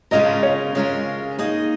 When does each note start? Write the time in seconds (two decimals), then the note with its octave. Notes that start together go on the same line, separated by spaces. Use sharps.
0.11 C#3 G#3 C#4 F4 A#4 D#5
0.43 C#5
0.75 C#3 G#3 C#4 F4 A#4
1.39 A#3 D#4 G#4 D#5